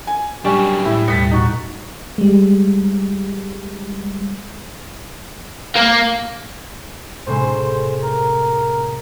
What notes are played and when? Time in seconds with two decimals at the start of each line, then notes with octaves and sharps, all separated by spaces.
0.07 G#5
0.45 F#3 G3 C#4 D4
0.85 A2 E4
1.08 D#2 B2 G3 A6 B6 C#7
1.31 D#4 F#4
2.18 G3 G#3
5.76 A#3
7.26 A2 C3 G#3 C5
8.03 A#4